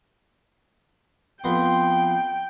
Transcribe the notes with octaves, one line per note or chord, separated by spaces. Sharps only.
F2 B3 G5 C6